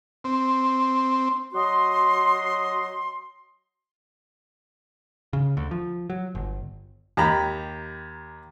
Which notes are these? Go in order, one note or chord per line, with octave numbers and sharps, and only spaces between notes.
C4
F#3 F#4 D#5 C6
C#3
D2
F3
F#3
G1
D#2 G4 A#5 B5